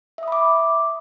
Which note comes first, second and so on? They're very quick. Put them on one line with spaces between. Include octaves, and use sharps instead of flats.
E5 D#6 B5 D6